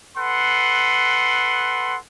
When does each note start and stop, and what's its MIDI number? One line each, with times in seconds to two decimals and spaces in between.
0.17 1.97 69
0.17 1.97 71
0.17 1.97 78
0.17 1.97 84